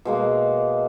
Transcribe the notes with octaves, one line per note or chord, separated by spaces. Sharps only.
B2 G#3 A#3